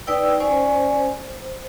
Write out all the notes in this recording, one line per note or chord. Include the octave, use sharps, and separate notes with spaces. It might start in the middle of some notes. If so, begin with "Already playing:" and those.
D#4 B4 D5 G5 E6
C#4 C5 D5 G#5
C5